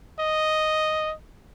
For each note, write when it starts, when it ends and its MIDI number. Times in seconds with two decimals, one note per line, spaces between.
0.19 1.14 75